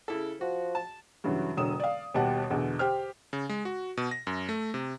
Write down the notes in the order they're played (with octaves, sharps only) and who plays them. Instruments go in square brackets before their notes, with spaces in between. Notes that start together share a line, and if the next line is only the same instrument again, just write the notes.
[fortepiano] C#3 E4 A4
[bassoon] F3 [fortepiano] F#4
[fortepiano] A5
[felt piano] G2 C#3 E3 F#3
E1 D3 F#3 D#6 E7
D5 F5
D#2 B2 G3 G4 F#5 A5
E2 B2 D3
G4 C5 F6
[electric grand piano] C#3
G#3
F#4
B2
A#6
F#2
A3
C3